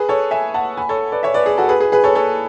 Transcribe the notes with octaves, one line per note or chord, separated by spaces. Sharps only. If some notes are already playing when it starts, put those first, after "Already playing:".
Already playing: G#4 B4
A4 C#5
E5 G#5
F#5 A5
G#5 B5
A4 C#5
B4 D5
C#5 E5
B4 D5
G#4
F#4 A4
G#4 B4
G#4 B4
G#4 B4
A4 C#5
A4 C#5